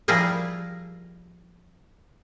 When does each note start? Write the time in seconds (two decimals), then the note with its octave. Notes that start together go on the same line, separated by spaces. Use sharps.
0.08 F3 G3 E4 F4 G#4 A#4